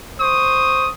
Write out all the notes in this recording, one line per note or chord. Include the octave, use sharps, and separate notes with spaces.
C5 C#6 D#6